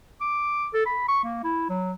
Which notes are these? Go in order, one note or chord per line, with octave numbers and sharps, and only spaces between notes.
D6
A4
B5
C#6
A#3
E4
F#3